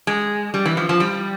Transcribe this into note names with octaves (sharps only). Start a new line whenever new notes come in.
G#3
G3
E3
F3
F3
G3